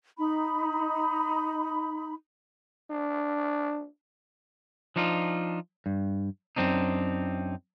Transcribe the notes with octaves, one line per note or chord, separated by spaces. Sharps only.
D#4 B5
D4
F3 D4 D#4 F4
G2
F#2 C4 D4 D#4